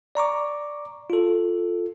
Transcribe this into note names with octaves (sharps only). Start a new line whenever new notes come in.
D5 A#5 C#6 D6
F4 A4